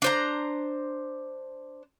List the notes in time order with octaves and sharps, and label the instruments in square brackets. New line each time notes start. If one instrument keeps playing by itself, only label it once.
[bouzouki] D4 C5 A#5